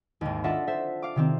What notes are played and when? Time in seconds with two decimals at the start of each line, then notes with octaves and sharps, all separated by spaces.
0.21 G#1 D#2
0.44 D4 F4 A4 D#5 E5 F#5
0.67 A4 C5 E5
1.02 F5 D6
1.16 C3 D#3 C4